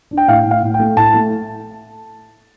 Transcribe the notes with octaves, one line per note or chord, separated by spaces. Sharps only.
D4
G5
A2 F5
A2
F5
A2
G5
A3
A2 A5
A3